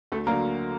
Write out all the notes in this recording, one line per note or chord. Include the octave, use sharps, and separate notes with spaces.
D2 A3 A4
D3 F#3 A#3 A#4